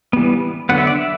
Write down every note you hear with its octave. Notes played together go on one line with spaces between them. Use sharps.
E3 G3 B3
D3 F#3 B3 F#5
E5
D5
E5